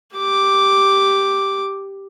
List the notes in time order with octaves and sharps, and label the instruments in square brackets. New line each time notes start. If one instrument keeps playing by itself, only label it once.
[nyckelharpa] G4 D6